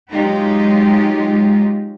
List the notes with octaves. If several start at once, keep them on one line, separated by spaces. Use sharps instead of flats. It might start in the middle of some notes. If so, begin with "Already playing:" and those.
F#3 G#3 D#4 F4 G4